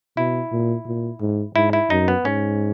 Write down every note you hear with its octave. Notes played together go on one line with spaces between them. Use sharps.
B2 E4
A#2
A#2
G#2
G#2 E4
E4
F#2 D#4
B3
G#2 C#4